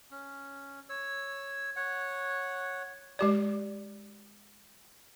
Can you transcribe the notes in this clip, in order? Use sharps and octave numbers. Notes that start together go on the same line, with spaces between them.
C#4
C#5 E6
C#5 F#5
G#3 G4 D5